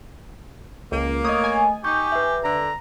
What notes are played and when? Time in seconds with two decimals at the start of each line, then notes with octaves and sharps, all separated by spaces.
0.92 C#2 A#3
1.24 A3 C#5 D#5 D#6
1.44 G#5
1.84 D#4 G4 C#6 G6
2.12 B4 E5
2.44 D3 A#5